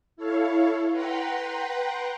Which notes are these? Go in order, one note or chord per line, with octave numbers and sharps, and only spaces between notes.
E4 A4 C#5 F5
B4 F#5 G5 A#5 C6